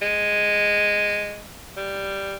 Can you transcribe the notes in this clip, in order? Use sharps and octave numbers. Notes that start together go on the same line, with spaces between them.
G#3
G3